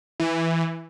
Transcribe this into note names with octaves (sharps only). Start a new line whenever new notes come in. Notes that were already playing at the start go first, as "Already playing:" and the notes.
E3